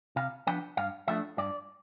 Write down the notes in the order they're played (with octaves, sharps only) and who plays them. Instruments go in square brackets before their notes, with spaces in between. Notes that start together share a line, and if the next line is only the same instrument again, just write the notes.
[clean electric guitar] C3 F5
F3 B3 D4 G5
G2 F5
F3 A3 D4 E5
G2 D5